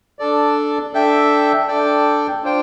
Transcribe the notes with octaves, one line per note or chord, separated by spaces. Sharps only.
D4 A4 D5
D4 A4 E5 G5
D4 A4 D5 G5
D4 F4 C5 G5